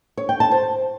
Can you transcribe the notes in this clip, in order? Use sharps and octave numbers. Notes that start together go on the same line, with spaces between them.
C#5
G5
A5
C5